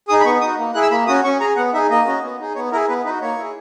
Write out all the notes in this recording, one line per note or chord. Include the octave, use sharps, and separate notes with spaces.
D#4 G#4 D#6
B5
B3 C#6
D#4 F#4 D#6
A#3
E4 G#4 F#6
E6
A#3 B5
C#4 F#4 D#6
C#4 C#6
G#4 A#5
B3 F#5
D#4 G#4 E5
A#3 D#5
C#4 F#4
B3
D#4 G#4
B3 C#5
E4 G#4 A#4
B3 B4
D#4 F#4 B4
A#3 C#5
E4 G#4